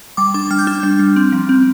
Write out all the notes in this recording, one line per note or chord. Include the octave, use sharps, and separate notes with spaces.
G3 D6
D4 D6
G3 F6
G6
D4 F6
G3
G3
C4
F3
C4